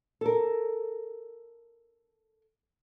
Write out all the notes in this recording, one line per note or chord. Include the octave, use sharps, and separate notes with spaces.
A4 A#4